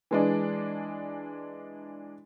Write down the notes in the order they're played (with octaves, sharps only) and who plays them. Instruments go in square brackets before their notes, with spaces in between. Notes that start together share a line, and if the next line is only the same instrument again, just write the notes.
[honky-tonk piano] E3 G#3 D4